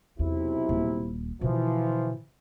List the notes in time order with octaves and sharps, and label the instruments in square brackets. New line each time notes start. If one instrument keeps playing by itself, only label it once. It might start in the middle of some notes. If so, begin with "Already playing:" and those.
[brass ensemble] B1 C3 E4 [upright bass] E2
[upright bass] D#1
[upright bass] B2 D3 [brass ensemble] E3 F3